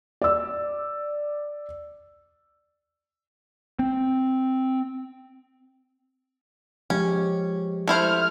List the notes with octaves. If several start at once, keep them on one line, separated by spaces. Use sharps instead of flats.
D5 E6
C4
F3 G#3 C#4 G4
A3 E4 C5 F6